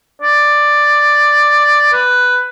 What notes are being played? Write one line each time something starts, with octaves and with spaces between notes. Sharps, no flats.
D5
B4